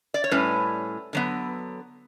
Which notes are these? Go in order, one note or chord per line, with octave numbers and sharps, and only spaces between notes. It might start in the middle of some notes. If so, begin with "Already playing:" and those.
D5
C#5
A2 G3 C#4 B4
D3 F#3 B3